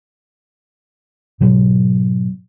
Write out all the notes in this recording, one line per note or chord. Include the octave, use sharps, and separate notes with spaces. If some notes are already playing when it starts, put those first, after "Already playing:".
G#2 B2 F#3